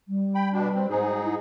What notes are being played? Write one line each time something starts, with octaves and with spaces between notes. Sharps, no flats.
G3
G5 B5
B2 D4
C4
G#2 D#4 G#4 C5
E4